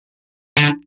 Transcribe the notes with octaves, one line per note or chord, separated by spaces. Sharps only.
D3